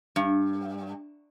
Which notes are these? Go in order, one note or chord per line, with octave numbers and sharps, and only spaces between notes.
G2